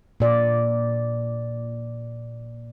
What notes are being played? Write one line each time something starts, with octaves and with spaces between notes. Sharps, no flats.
A#2 D5